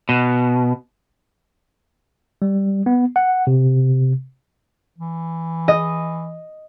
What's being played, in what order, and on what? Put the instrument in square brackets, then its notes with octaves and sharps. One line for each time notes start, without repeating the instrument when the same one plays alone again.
[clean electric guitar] B2
[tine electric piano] G3
B3
F#5
C3
[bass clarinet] E3
[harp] D#5